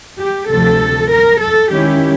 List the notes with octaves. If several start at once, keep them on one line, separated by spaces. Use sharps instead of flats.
G4
D2 C3 F3 A4
A#4
A4
D#3 G#3 C#4 E4 G4